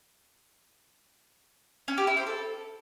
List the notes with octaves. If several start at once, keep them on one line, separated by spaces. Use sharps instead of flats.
C#4
G4
E4
C5
A4